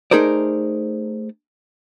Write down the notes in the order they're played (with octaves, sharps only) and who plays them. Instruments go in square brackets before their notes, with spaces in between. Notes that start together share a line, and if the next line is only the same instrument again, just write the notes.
[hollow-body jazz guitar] A3 D#4 G#4 A#4 C5 D5